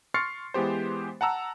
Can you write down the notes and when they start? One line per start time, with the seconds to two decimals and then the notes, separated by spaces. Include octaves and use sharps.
0.14 C6 C#6 F6 A6 C7 C#7
0.54 E3 G#3 B3 G4 C5
1.21 F#5 A5 A#5 E6